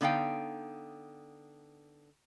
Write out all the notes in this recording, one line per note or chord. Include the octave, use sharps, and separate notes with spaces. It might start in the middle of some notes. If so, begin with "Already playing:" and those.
D3 B3 D#4 F5 G5